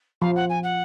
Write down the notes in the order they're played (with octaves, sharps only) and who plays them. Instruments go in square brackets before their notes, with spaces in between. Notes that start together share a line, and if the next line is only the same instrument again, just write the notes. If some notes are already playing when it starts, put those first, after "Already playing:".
[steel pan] F3 [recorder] F5
[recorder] F#5
G#5
F#5